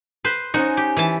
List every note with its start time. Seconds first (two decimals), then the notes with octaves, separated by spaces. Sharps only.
0.24 B4 C5
0.54 C#4 D#4 F#4 C5 G#5
0.77 G4
0.97 E3 A5